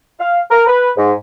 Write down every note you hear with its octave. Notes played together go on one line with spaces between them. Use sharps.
F5
A#4
B4
G#2